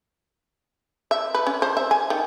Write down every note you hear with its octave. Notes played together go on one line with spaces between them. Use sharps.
E5
B4
C#4
C5
E5
G#5
D#3